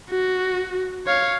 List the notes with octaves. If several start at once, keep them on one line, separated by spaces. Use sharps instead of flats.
F#4
C#5 F5